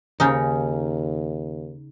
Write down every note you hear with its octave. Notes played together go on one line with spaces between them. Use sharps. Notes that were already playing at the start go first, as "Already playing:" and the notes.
D#2 C#3 C#4 D#4